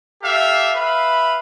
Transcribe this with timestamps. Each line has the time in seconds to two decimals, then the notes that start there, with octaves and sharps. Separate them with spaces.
0.22 G4 A4 E5 F5
0.76 B4 E5 F5 B5